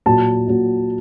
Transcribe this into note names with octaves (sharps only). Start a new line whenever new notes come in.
A#2 F#3 A5
A#2 F#3